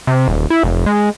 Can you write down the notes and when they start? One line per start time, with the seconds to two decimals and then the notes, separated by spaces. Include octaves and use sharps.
0.07 C3
0.28 D#1
0.50 E4
0.63 F1
0.86 G#3